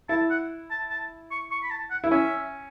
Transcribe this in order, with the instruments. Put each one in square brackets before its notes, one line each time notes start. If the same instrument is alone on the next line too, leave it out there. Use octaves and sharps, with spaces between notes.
[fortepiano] E4 [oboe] A5
[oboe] F#5
A5
A5
C#6
C#6
B5
A5
F#5
[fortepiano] E4
[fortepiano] C#4 [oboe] E5